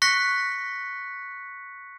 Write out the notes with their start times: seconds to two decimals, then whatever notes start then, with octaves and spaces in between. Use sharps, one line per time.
0.02 C#6 F#6 A#6 B6 C#7